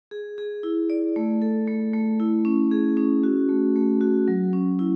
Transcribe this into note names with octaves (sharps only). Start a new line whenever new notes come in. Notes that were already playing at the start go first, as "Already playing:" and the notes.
G#4
G#4
E4
D5
A3
A4
A3
A3
E4
C#4
G#4
C#4
F#4
A3
A3
F#4
F#3
C#4
E4